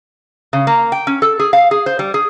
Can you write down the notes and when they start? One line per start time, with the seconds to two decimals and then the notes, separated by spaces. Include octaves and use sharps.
0.53 C#3
0.67 A#3
0.92 G5
1.07 C#4
1.22 A4
1.40 G#4
1.53 F5
1.71 G#4
1.86 C5
1.99 G3
2.14 G#4